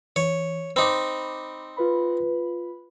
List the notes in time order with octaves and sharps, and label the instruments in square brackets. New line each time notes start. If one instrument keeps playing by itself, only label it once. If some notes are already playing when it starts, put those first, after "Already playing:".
[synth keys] E3 [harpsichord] C#5
[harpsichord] C4 D#4 [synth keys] B5 D6
[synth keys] F4 B4 B5